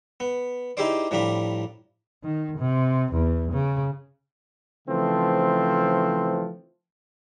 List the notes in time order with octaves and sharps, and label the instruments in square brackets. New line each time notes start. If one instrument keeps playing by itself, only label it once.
[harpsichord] B3
D#4 E4 G4 G#4 C5 D5
A2 F3 G3 D4 A#5 B5
[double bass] D#3
C3
E2
C#3
[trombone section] C#3 E3 F3 A3 C4